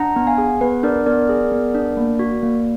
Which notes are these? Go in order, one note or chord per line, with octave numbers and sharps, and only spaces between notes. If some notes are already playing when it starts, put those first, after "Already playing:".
Already playing: D4 F#5 A#5
B3
F5 G#5
G#4
B3 B4
D4 A#4 D5
B3 A#4 D5
G#4
B3
D4
A#3
F#4
A#3